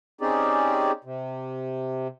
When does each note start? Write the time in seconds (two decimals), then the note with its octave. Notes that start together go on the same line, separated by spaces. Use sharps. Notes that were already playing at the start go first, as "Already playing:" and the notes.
0.21 C4 C#4 D#4 G4 G#4 D5
1.04 C3